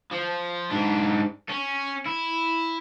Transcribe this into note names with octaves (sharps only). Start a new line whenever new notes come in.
F3
G#2 D4
C#4
E4